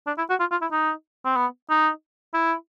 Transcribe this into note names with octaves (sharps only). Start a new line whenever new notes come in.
D4
E4
F#4
F4
F4
E4
D#4
C4
B3
D#4
E4